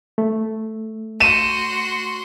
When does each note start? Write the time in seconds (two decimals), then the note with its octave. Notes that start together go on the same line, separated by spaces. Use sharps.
0.18 A3
1.20 F#4 C6 D#7 E7